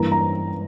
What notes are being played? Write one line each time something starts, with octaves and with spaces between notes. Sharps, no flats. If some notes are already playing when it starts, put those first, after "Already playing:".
Already playing: G2 E3 A#3 A#5
A#5